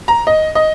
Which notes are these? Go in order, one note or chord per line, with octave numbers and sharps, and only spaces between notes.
A#5
D#5
D#5